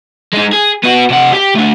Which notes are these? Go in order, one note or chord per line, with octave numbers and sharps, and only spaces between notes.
G#3 D#4
G#4
B3 F#4
C3 F#5
G4 G5
A3 D4